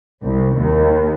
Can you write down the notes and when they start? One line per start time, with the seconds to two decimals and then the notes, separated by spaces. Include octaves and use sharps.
0.24 C2
0.58 D#2